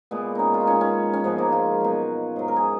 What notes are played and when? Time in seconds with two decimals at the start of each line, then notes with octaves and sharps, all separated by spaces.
0.11 A#2 G#3 B3
0.35 C#4 D#4
0.54 F4
0.61 D#4
0.67 B2 G#3 C#4
0.81 C#4
1.13 C#4
1.24 G#2 F3 G#3 B3
1.38 A#3
1.52 F4
1.81 B2 F#3
2.36 G#2 F#3
2.48 A#4
2.56 G#4